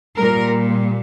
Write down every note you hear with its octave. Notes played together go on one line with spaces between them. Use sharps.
A#2 G3 A#4